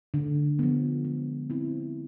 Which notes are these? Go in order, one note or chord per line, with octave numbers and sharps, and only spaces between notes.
D3
F3 B3
G#3
C4 E4